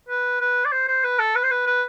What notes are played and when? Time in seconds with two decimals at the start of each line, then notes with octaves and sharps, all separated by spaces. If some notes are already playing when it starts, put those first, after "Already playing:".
0.09 B4
0.41 B4
0.65 D5
0.72 C5
0.88 C5
1.04 B4
1.19 A4
1.35 B4
1.43 C5
1.51 B4
1.67 B4